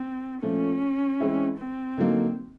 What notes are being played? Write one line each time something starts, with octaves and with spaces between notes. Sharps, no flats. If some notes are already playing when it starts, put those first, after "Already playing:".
Already playing: C4
A#2 F3 A3 C#4
E3 G#3 C4 E4
C4
D3 F#3 A#3 D#4